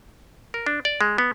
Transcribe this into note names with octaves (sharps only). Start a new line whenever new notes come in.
A#4
D4
D5
G#3
B3